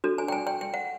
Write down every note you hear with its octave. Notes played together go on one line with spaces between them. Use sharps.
D4 F#4 A4
G#5
G5
G#5
G5
G5
F#5